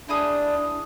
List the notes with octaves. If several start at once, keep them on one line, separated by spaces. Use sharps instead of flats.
D4 E4 G#4 D#6